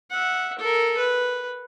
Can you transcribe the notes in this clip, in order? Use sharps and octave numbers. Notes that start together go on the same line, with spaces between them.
E5 F#5
A4 A#4
B4